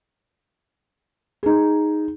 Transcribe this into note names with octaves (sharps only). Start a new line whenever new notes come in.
D#4 G#4